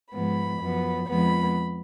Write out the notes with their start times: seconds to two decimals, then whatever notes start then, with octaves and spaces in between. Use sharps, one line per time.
0.13 G#2 F3 B3 B5
0.60 F#2 F3 B3
1.08 F2 F3 G#3 B3 B5